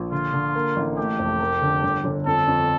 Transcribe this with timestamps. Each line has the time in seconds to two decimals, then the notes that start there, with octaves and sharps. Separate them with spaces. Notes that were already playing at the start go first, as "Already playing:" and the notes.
Already playing: A#1
0.12 D3 F4
0.33 D3
0.55 A#3
0.76 A1
0.97 A3 G4
1.19 F1
1.40 A#4
1.62 D3
1.83 G1
2.04 G1
2.26 F2 A4
2.48 F2